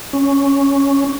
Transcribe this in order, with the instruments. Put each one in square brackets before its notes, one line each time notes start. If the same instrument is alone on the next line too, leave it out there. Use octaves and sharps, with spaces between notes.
[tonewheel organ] C#4